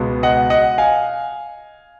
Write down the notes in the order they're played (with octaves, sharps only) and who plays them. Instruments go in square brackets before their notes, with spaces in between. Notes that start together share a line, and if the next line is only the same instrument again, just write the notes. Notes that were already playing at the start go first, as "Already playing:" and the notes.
Already playing: [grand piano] C#2 B2 G#3 B3
D#5 F#5
D#5 F#5
F5 G#5